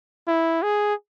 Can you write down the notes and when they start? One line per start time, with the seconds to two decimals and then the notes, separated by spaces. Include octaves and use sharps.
0.28 E4
0.62 G#4